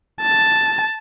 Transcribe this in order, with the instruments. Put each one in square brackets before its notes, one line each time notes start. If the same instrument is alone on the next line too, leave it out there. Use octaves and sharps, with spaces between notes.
[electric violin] A5